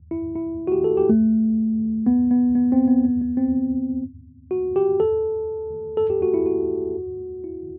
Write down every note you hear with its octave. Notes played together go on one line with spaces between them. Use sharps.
E4
E4
F#4
G4
A4
G4
A3
B3
B3
B3
C4
B3
B3
B3
C4
F#4
G4
A4
A4
G4
F#4
E4
F#4
E4